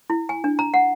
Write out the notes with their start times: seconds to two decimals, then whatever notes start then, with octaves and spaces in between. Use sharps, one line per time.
0.10 E4
0.29 G#5
0.44 D4
0.59 A#5
0.74 F#5